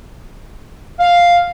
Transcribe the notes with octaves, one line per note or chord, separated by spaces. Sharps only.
F5